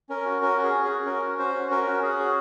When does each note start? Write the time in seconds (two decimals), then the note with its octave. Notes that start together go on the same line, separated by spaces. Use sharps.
0.09 C#4 A#4
0.25 F#4
0.42 C#4 A#4
0.58 F#4
0.64 G#4
0.74 C#4
0.84 G#4
0.90 F#4
1.06 C#4 A#4
1.22 F#4
1.39 C#4 C5
1.55 F#4
1.70 C#4 A#4
1.87 F#4
2.03 C#4 G#4
2.19 F#4